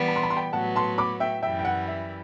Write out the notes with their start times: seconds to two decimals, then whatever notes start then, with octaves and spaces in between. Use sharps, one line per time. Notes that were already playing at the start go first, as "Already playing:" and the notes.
Already playing: E3 G3 B3
0.08 B5
0.16 C6
0.23 B5
0.30 C6
0.37 G5 B5
0.53 A2 F#3 B3 F#5 A5
0.76 A5 C6
0.98 B5 D6
1.20 E5 G5
1.42 F#2 E3 G3 E5 G5
1.59 G5
1.65 F#5
1.88 E5